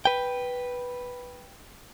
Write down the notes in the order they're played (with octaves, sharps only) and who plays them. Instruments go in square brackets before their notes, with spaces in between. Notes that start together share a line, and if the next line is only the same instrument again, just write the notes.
[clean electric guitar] B4 G5